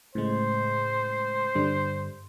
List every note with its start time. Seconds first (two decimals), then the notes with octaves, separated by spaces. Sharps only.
0.15 A2 C#3 G#3 C5
1.55 G2 D3 G3